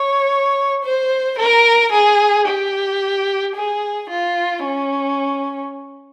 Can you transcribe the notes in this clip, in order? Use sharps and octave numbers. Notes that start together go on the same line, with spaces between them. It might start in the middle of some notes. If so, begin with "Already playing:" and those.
Already playing: C#5
C5
A#4
G#4
G4
G#4
F4
C#4